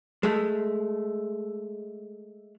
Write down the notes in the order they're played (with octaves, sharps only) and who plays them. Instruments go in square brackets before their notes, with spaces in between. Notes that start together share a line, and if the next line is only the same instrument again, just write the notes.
[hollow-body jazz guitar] G#3 A3